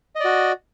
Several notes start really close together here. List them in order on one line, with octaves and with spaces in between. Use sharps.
D#5 D5 F#4